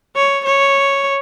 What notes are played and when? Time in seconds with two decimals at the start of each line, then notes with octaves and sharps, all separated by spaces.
0.16 C#5
0.45 C#5